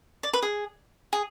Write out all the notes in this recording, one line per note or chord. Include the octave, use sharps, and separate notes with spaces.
D5
B4
G#4
G#4